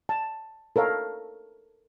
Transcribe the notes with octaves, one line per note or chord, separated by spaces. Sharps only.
A5
A4 A#4 C#5 F5